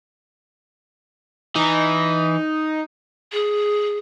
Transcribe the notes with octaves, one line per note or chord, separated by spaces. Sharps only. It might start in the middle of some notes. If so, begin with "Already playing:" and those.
E3 D#4
G#4